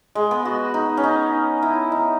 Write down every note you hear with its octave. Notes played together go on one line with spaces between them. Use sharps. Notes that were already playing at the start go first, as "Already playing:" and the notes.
G#3
B3
F#4
D#4
C#4
D#4
E4
D#4